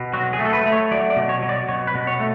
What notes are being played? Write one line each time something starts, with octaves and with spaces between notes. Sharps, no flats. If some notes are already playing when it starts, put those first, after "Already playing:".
Already playing: B2
F#3 F#4
G#4
A3
A4
B4
A3
C#5
F#3 D5
D5
B2
C#5
F#3
D5
B2 C#5
B4
B2
C#5
A3